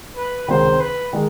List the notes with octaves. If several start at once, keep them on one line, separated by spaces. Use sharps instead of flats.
B4
C#2 C3 D#3 C5
B4
D#3 G#3